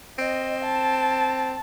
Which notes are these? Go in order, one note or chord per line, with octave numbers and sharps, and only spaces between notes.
C4 D#5
A5